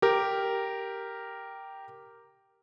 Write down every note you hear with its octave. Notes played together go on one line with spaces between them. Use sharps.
G4 A#4